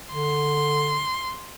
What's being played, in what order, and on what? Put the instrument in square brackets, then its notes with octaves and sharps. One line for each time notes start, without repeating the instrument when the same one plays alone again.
[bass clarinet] D3 [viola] C6